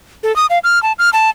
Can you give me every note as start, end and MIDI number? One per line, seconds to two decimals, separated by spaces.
0.23 0.35 69
0.36 0.46 87
0.50 0.59 77
0.64 0.81 89
0.83 0.93 81
0.99 1.10 89
1.13 1.30 81